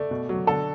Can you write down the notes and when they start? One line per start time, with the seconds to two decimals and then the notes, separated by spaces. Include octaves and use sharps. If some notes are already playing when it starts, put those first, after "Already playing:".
Already playing: A3 D5
0.11 B2
0.29 F#3
0.47 D3 A4